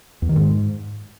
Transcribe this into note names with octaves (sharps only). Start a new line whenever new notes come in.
E2
D#3
G#2